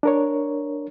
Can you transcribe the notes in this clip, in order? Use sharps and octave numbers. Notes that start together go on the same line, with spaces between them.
D4 A#4 C#5